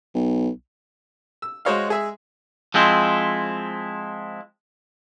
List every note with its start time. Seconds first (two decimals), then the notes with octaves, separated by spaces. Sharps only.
0.15 B1
1.42 E6
1.65 G#3 F#4 C5 C#5 D#5 F5
1.88 G#3 G#4 E5
2.74 F3 G#3 C4 E4